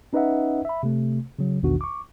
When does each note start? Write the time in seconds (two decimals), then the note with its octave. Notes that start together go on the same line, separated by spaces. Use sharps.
0.13 C#4 D#4 B4 D#5 E5 F#5
0.65 E5 B5
0.83 C3 A3
1.39 C#3 F#3
1.63 A#1 E2 B2 D#3 D4 F#4
1.81 C#6 D6